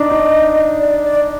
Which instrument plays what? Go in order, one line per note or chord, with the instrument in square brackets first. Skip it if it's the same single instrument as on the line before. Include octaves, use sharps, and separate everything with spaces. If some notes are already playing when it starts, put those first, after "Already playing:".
Already playing: [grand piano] D4 D#4
[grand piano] D#4 [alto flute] D#5
[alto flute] D5
D5